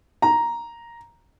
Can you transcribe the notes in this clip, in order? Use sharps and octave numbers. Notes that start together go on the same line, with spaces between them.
A#5